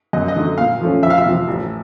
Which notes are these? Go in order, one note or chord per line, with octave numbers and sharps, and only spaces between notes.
F#2 D#5
D#5
D3 F#3 A3
A#2 F5
F3 A3 C#4
F2 E5
F5
E5
C3 F3
A1